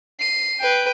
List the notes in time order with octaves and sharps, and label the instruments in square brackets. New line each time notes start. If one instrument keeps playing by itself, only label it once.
[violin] C7 D#7
[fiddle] B4 G5